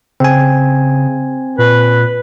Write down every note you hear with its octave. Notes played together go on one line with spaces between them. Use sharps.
C#3 C4 G#5
A#2 B4